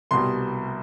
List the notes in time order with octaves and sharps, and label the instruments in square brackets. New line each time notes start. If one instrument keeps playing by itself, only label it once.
[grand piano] C2 B2 G3 C6